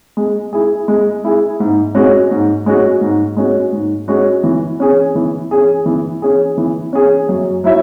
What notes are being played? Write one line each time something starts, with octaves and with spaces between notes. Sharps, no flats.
G#3
E4 G#4
G#3
E4 G#4
G#2
G#3 C#4 F#4
G#2
G#3 C#4 F#4
G#2
G#3 C#4 F#4
G#2
G#3 C#4 F#4
E3
C#4 G#4
E3
C#4 G#4
E3
C#4 G#4
E3
C#4 G#4
F#2
F#3 E4 C#5 E5